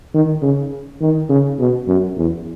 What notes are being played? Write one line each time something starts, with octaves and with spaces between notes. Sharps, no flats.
D#3
C#3
D#3
C#3
B2
F#2
E2